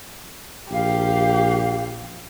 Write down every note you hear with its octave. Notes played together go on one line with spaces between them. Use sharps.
A#1 G4 F5